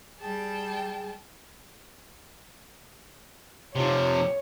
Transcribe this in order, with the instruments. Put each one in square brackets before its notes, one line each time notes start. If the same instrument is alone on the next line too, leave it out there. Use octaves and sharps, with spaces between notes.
[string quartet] G3 G5 A5 [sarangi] G#4
[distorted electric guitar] C3 F3 [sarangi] C#5